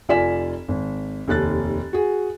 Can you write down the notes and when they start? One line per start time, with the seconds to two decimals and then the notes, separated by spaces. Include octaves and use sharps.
0.09 F1 F4 D5 G#5 B6 E7
0.68 G#1
1.28 F1 D#2 F#6 A6
1.93 F#4 G#4